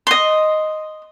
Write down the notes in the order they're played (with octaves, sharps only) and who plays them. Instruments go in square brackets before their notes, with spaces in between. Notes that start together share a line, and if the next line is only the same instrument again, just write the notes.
[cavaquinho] D#5 C6